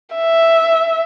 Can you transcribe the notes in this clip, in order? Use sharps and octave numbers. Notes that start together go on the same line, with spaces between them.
E5